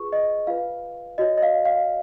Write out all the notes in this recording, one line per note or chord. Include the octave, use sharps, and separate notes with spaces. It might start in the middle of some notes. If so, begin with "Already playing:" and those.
Already playing: F4 G#4 B4 C#6
D#5
F4 B4 F5
F#4 C#5 D#5
D#5
F5
F5